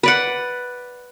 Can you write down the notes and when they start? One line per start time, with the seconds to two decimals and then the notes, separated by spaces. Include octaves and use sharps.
0.03 B4 D5 F#5